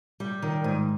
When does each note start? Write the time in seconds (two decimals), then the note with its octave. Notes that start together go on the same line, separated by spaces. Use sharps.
0.20 G3
0.42 D#3
0.64 G#2